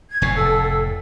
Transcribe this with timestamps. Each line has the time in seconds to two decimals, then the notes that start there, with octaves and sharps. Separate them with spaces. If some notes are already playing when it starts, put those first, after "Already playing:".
0.09 G#6
0.22 F1 A2 G#5 C#6
0.35 A4 E6